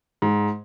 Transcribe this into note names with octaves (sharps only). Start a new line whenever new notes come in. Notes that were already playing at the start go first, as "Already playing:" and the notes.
G#2